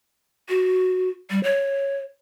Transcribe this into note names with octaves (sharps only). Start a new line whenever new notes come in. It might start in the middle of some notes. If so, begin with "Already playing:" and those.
F#4
G3
C#5